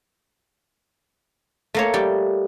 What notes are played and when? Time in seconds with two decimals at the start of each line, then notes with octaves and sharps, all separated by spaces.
1.74 A3 A#3 C#5
1.94 G3 G4